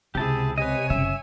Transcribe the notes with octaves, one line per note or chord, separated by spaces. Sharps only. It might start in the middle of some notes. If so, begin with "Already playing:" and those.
C#2 C3 E4 G4 G#4 A5
C3 B4 C#5 D#5 G#5
F#1 C#3 E5